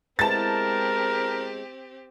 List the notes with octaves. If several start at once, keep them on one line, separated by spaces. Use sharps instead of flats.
G#3 B3 C4 E4 G4 A#4 A5 A6